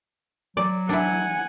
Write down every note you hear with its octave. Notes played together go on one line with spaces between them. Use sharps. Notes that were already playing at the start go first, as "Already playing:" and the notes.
F#3 D5
D4 E4 F#5 G#5